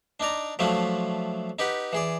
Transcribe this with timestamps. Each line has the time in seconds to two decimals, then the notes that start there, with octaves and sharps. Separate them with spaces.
0.20 D4 D#4 D5 A#5
0.59 F3 F#3 A3 D4 E4 F4
1.59 D#4 G4 B4 F#5
1.93 E3 G#4 D5